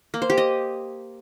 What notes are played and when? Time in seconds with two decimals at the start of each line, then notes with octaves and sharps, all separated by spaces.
0.14 A#3
0.22 C5
0.30 G4
0.38 D#5